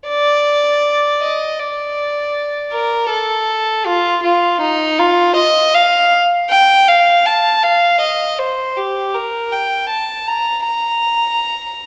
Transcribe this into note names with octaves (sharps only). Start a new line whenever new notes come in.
D5
D#5
D5
A#4
A4
F4
F4
D#4
F4
D#5
F5
G5
F5
A5
F5
D#5
C5
G4
A#4
G5
A5
A#5
A#5